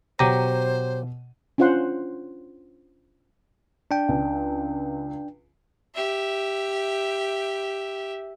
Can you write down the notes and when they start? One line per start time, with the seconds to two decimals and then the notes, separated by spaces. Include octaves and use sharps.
0.19 B2 F#3 G4 C5 A#5 D#7
1.58 C#4 D4 F4 C5 F#5 C6
3.91 D4 G5
4.08 C#2
5.94 G4 E5